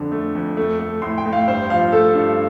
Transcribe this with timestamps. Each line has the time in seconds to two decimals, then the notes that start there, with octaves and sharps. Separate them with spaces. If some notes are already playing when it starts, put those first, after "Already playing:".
Already playing: F2 D3
0.12 A3
0.35 F2
0.57 A3
0.79 A3
1.02 A2 C6
1.18 G5
1.26 A2
1.33 F5
1.48 G2 C5
1.70 F3 F5
1.92 A3 A4
2.15 G2